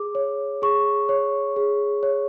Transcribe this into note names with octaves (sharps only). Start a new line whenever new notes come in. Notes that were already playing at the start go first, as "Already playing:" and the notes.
Already playing: G#4 D6
C#5
G#4 C#6
C#5
G#4
C#5